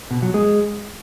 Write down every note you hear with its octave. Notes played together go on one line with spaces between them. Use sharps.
B2
F#3
G#3